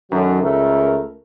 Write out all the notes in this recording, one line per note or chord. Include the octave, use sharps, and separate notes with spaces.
F#2 D#3 F#3 F#4 A4
C#2 A3 A#4